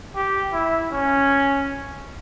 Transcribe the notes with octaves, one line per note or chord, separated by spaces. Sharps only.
G4
E4
C#4